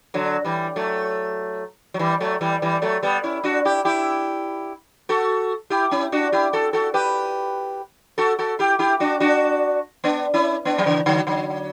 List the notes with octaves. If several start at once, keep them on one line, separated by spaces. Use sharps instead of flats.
D3 F#3
E3 G3
F#3 A3
F#3
E3 G3
F#3 A3
E3 G3
E3 G3
F#3 A3
G3 B3
C#4 E4
D4 F#4
E4 G4
E4 G4
F#4 A4
E4 G4
C#4 E4
D4 F#4
E4 G4
F#4 A4
F#4 A4
G4 B4
F#4 A4
F#4 A4
E4 G4
E4 G4
D4 F#4
D4 F#4
B3 D4
C#4 E4
B3 D4
F#3
C#3 E3
D3 F#3
D3 F#3